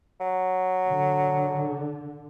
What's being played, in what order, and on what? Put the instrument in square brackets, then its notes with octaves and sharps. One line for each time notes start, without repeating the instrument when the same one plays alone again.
[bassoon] F#3
[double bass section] D3